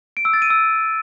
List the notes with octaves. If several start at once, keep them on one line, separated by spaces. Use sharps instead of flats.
D7
E6
A6
D#7
E6